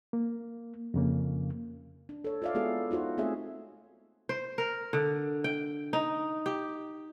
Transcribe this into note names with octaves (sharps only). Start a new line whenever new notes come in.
A#3
F2 C#3 A#3
D4
A4 C#5
F4 C5 D5 E5 F5
G#3 B3 E4 F#4 G#4 A4
D#4 F4 F#4 C5
A3 C4 G#4 A4 C#5 E5
C5
A#4
D3
G5
D#4
G4